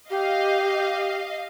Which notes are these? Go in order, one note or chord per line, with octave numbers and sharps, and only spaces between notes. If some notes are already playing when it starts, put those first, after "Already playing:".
G4 D#5 F5